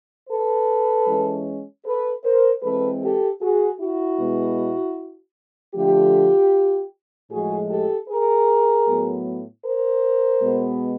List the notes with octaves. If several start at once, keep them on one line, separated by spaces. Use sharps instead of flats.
A4 B4
E3 G#3 C#4
A4 B4
A#4 C5
E3 G#3 C4 A4 B4
G4 A4
F#4 G#4
E4 F#4
B2 G#3 B3
D3 F3 A3 F4 G4
A2 F3 G#3 F#4 G#4
G4 A4
G#4 A#4
A2 F#3 B3
A#4 C5
B2 G#3 B3